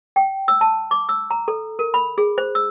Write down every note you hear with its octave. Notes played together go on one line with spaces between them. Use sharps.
G5
E6
A5
D6
E6
A#5
A4
A#4
B5
G#4
C5
E6